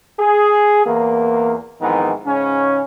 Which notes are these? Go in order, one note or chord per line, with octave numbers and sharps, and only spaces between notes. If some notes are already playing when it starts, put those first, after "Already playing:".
G#4
E2 A#3
F2 G#2 D#3 E3 B3
G#2 C#3 C#4